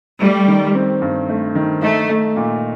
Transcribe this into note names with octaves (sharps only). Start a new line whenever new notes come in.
G3 A3
D#3
C4
G2
A3
D#3
A3 D#4
A3
A#2